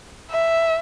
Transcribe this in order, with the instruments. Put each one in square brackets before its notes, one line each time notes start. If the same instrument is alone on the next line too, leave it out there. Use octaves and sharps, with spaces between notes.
[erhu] E5